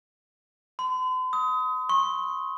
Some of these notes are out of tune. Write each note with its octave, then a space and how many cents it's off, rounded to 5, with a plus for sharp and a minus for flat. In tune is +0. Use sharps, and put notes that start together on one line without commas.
C6 -45
D#6 +25
C#6 -35